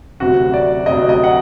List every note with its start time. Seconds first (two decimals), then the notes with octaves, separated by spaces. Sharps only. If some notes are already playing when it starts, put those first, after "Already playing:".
0.20 D2 C3 F#3 F#4
0.54 D5
0.86 D2 C3 F#3 D#5
1.09 D#5
1.24 F#5